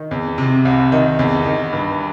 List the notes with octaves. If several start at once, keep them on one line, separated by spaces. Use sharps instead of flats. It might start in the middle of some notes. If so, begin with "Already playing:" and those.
Already playing: D#3
E2
C3
C2
D#3
E2
D#3
G2